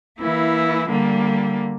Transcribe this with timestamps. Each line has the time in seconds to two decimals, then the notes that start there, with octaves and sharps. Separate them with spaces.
0.20 E3 A#3 E4
0.88 D3 G3 A#3